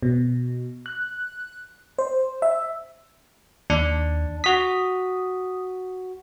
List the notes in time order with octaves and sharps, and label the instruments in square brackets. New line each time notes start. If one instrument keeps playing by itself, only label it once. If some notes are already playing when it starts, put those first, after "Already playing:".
[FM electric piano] B2
F#6
C5
E5
[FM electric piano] D#2 [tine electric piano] D4
[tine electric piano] F#4 B6 [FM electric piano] D#6